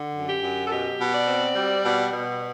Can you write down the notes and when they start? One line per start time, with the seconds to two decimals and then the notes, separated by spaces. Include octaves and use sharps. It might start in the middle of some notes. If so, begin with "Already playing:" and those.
Already playing: D3
0.14 F#2
0.28 G4
0.42 F#2
0.65 A4
0.71 B2 G4
0.99 B2
1.13 D5
1.27 C4
1.55 G3
1.84 B2
2.12 B2